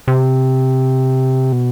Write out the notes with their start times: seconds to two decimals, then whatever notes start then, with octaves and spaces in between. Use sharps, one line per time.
0.08 C3
1.53 B2